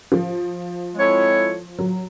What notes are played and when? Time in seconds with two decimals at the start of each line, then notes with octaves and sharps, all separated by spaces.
0.12 F3
0.95 G#3 C4 E4 A4 C#5
1.79 F#3